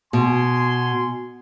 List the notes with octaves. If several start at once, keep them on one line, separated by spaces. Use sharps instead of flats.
B2 G#5 C6